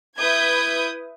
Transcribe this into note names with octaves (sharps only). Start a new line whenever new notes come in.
E4 B4 D#6 G6 G#6